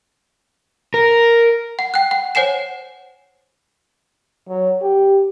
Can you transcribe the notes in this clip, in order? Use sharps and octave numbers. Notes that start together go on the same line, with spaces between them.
A#4
F#5
G5 F#6
F#5 G5
C5 C#5 F#5 G#5 C7 E7
F#3
G4